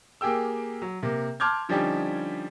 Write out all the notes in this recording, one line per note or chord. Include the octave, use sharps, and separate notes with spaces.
A#3 G4 G#4 G5 E6
F#3
C3 A#3
A5 C6 D6 F6 G6 G#6
D3 F3 G3 C#4 D#4 G4